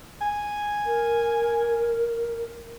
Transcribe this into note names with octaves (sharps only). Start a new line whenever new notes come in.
G#5
A#4